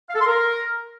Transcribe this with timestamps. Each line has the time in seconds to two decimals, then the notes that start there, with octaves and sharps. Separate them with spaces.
0.09 F5
0.15 A4
0.21 C6
0.27 A#4